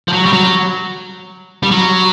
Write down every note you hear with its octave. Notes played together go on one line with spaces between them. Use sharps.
F3
F#3
G3
F#3
G3
F#3